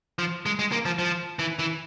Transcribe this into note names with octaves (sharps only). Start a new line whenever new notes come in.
F3
G#3
G#3
A#3
F3
F3
E3
E3